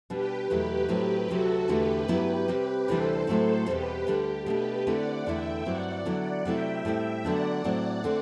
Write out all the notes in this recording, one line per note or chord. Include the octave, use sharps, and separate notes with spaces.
B2 G3 D4 G4 B4
E2 B2 F#3 A3 E4 G4 B4
A2 F#3 C4
D2 C3 F#3 F#4 A4
E2 D3 A3 E4 G4 B4
G2 F#3 B3 E4
C3 G3 C4
D2 C3 E3 G3 D4 A4 C5
A2 F#3 A3 C4 E4 A4 C5
E2 B2 G3 C4 G4 B4
D2 D3 G3 D4 G4
B2 A3 D4 G4 B4
D3 A3 C4 E4 D5 F#5
E2 D3 A3 E4 E5 G5
G2 F#3 C4 E4 D5 F#5
D3 F#3 B3 E4 D5 F#5
C3 F#3 A3 C4 E4 E5 G5
A2 G3 C4 E4
D3 F#3 B3 D4 D5 F#5
A2 F#3 C4
D3 A3 C4